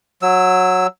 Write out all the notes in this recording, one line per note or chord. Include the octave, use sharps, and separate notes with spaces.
F#3 E6